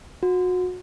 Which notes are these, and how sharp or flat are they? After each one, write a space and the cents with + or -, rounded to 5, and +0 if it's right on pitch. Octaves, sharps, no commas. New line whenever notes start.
F#4 -30